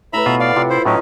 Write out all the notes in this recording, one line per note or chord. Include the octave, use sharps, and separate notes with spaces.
A2 A4 B4 E5 A#5 B5
B2 F4
D5 F5 F#5
C3 F4
E4 C5
A2 F#3 C#4 D#4 E4